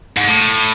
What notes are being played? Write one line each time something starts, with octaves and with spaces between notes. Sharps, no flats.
G#2
A2